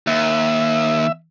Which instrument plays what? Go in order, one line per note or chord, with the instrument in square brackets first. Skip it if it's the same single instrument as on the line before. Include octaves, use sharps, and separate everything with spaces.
[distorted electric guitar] D#2 [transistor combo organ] E5